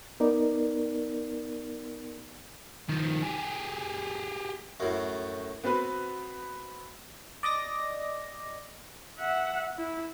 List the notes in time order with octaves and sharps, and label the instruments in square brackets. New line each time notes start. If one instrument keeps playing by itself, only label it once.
[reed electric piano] B3 D#4 A#4 D5
[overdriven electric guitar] D#3 F3
G4 G#4
[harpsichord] F#2 A2
[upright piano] B3 C4 F#4 B4
[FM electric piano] D5 D#5 D6 A#6
[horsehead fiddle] E5 F#5
E4